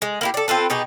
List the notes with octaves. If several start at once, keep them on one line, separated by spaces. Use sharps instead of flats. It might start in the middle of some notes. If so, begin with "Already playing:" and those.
G#3
A#3 E4 G4
A4 D5
C4 F4 A4 B4
B2 D#4 G4 G#4